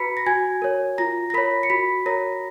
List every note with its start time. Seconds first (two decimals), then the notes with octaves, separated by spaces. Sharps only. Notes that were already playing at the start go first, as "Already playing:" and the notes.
Already playing: F#4 B4 A#5 B5 B6 C#7
0.17 A#6
0.26 F#4 G#5 G#6
0.62 A#4 C#5
0.98 F4 A#5 A#6
1.30 A#6
1.34 A#4 C#5 B5 B6
1.63 C#7
1.70 F#4 B5 B6
2.06 A#4 C#5 A#5 A#6